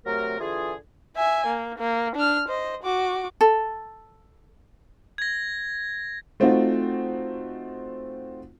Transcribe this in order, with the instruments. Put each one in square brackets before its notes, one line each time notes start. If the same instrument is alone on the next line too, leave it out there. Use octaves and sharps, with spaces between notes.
[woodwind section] C3 F#3 A3 A#4
D3 E3 F4 G#4
[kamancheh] E5 G#5
A#3
A#3
D4 F6
C5 D#5
F#4 D6
[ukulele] A4
[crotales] G#6 A#6
[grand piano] A3 C4 D#4 F4 F#4